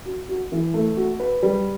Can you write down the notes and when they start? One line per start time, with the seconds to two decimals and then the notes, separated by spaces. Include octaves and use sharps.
0.06 F#4
0.29 F#4
0.52 E3
0.74 A3
0.97 F#4
1.20 B4
1.43 G3